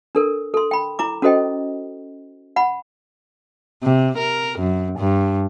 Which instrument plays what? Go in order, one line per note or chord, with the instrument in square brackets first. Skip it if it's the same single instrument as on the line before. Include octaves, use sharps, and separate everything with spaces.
[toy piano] D4 A4 A#4
A4 C6
G5 B5
E4 A#5 D6
C#4 F#4 A4 C5 D#5 G5
F#5 B5
[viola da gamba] C3
A#4
F#2
G2